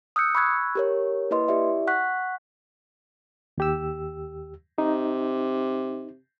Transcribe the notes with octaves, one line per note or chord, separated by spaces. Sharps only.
D#6 E6 F#6 G6 C#7
B5 C#6 E6 F#6 G#6
G4 A#4 C#5
A#3 E4 B4 D#5 C6
E4 G4 D5 E5
F#5 C#6 F#6 B6
D#2 G4 E6
C3 D#4